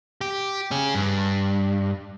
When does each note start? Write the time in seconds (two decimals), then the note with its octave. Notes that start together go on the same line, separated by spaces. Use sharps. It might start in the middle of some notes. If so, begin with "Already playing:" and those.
0.21 G4
0.71 C#4 G#4
0.95 G2